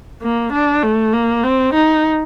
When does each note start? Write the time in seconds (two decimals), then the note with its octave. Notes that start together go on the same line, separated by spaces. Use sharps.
0.22 A#3
0.53 D4
0.83 A3
1.13 A#3
1.44 C4
1.74 D#4